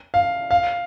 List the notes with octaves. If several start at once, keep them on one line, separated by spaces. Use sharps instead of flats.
F5
F5